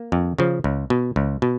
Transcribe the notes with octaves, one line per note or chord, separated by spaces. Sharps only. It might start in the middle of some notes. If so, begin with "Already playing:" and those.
Already playing: A#3
F2
C#3 F3
C#2
B2
C#2
B2